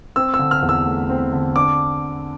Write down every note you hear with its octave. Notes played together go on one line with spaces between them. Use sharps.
C4 E6
E6
D3
F6
E2
E6
A3
C4
D3
D4 D6